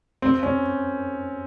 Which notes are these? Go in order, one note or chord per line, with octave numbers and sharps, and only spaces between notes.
C4
C#4